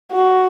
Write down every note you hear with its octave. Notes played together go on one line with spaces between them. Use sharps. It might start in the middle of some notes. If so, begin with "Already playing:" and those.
F#4